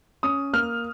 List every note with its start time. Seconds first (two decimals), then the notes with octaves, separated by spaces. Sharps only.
0.23 C#4 D#6
0.53 A#3 F6